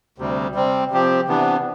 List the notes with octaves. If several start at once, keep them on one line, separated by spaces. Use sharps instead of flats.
D2 C3 G3
C3 G3 C4
C3 F3 C4 G4
C3 E3 B3 D4